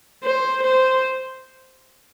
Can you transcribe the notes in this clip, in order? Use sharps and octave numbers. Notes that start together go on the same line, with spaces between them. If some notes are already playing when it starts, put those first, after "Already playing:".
C5
C5